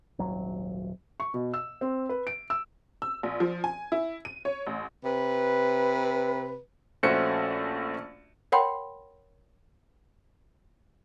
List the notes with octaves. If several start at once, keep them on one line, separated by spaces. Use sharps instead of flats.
D#1 G#1 F#3
C#6
B2
E6
C4
B4
D7
E6
E6
A#1
F3
G#5
E4
D#7
C#5
A1
C3 B4
A#1 A3 C#4 F#4 C5 C#7
A#4 C#5 F#5 G5 B5 C6